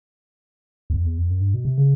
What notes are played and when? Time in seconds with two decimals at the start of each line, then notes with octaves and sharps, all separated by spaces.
0.90 E2
0.94 F2
1.05 E2
1.18 F2
1.30 F#2
1.41 G2
1.54 B2
1.65 C3
1.78 C#3